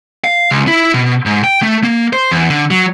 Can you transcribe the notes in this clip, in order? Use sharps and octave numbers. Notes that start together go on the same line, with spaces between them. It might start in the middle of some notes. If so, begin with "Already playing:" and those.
F5
C#2
E4
B2
G#2
G5
A3
A#3
C5
E2
D3
F#3